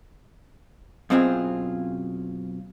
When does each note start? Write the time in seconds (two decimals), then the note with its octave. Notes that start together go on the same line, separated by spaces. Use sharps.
1.10 F#2 B2 C4 F4 G#4